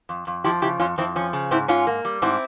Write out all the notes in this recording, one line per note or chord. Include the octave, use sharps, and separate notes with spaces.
F2
F2
F3 E4 G4
C#3 E4 G4
F2 C#4 F4
F2 C4 E4
F3 C#4
C#3
G#2 C4 E4
G#2 C#4 F4
A#3
G3
G#2 C4 E4